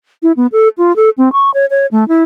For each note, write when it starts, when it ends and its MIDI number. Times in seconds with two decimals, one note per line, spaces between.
0.23 0.32 64
0.37 0.47 59
0.52 0.68 69
0.78 0.95 65
0.96 1.10 69
1.18 1.32 60
1.32 1.50 85
1.54 1.66 73
1.70 1.86 73
1.92 2.07 57
2.08 2.23 64